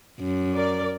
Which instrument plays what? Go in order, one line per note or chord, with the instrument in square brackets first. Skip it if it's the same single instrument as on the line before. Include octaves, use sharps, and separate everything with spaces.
[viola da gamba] F#2
[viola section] A#4 D5